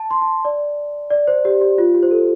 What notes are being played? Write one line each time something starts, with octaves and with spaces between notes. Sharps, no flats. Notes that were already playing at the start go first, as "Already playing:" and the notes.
Already playing: A5
C6
A5
D5
D5
C5
G4
G4
F4
G4
C5
A4